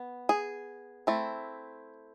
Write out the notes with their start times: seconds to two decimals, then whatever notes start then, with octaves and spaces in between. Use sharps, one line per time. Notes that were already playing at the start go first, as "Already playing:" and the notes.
Already playing: B3
0.29 G#4
1.07 A3 C4 E4